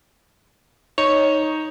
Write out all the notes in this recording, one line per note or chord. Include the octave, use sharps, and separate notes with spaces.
D#4 C#5